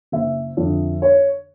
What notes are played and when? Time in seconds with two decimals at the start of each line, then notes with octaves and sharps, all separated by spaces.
0.12 F#1 E5
0.57 F2 D3
1.02 C#5